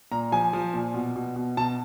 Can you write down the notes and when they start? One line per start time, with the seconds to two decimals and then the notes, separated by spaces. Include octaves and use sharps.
0.12 A#2 A#5
0.32 F3 G#5
0.53 F3
0.74 A#2
0.94 B2
1.16 B2
1.36 B2
1.57 B2 A5